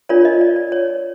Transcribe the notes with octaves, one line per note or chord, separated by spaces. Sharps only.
D4 F4 A#4 C#5 D5
D#5
D5
D5
C#5